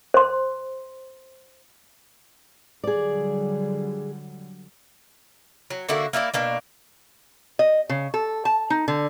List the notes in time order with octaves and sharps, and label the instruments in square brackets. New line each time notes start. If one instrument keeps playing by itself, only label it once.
[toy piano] C5 C6
[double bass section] D3 F#3 G3 [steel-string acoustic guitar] G#4 D5
[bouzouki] F#3
D3 A#3 E4 F#4
A#3 E4 A#4 D5
B2 A#3 D4
[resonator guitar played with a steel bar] D#5
C#3
A4
A5
D#4
D3